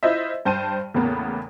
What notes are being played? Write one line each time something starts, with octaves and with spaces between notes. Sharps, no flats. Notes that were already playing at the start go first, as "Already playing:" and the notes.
E4 F4 C5 D#5 E5
G2 C5 G5 A5 C6 D#7
E2 A2 C#3 A#3 B3